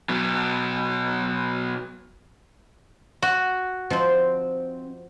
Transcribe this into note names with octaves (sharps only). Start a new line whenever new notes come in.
B2 F#3
F#4
F3 C4 D#4 C5